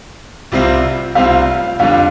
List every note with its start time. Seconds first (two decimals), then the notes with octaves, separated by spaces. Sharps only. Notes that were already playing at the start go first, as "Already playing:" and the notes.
0.52 C2 C3 G3 C4 F4
1.15 C2 C3 G3 C4 F4 F5
1.79 F2 D3 G3 D4 F4 F5